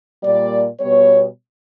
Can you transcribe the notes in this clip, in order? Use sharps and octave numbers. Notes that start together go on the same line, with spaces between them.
A#2 G3 A#3 D5
B2 G3 B3 C#5